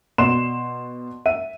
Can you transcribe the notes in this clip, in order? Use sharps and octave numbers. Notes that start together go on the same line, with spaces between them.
B2 D5 C6 E7
E5 D#7